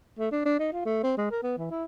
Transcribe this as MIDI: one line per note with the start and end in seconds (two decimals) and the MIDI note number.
0.19 0.31 57
0.32 0.44 62
0.45 0.59 62
0.59 0.69 63
0.73 0.85 65
0.85 1.03 57
1.03 1.13 60
1.18 1.30 56
1.31 1.42 70
1.43 1.58 59
1.58 1.70 52
1.71 1.85 64